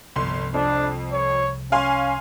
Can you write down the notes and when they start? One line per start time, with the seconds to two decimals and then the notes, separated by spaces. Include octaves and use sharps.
0.16 G1 C2 F3 C6
0.54 F2 D4
1.12 C#5
1.72 C#4 F5 G#5 C6